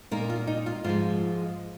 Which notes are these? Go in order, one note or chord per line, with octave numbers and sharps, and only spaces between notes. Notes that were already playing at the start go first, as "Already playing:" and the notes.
A#2 A#3 D#4 A#4
F4
D#4
F4
G#2 F3 G#3 F4